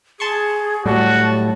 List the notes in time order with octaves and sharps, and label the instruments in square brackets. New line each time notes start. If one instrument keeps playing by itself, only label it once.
[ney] G#4 [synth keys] A5 C6 C#6
[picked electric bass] A2 [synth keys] F#3 G3 [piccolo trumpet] F#4 [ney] A5